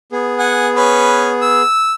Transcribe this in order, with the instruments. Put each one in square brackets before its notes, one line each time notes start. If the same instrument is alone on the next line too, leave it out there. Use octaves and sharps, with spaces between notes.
[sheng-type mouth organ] B3 G#4
[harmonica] F#5 G#5
C#4 B4
E6